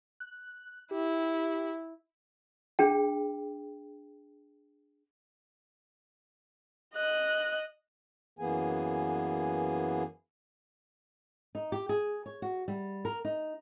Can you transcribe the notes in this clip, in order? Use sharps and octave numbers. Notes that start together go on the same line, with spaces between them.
F#6
E4 G4
D4 G#4 G5
D#5 F#6
F#2 E3 A#3 B3 G#4 G#5
D#4
G4
G#4
C#5
F#4
G3
A#4
D#4